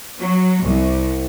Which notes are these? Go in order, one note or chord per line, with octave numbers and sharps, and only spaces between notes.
F#3
C2